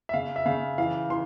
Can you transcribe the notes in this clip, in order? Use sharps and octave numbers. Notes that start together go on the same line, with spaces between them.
E5
C#3 F5
E5
C#3 F5
E3 F5
E3 C6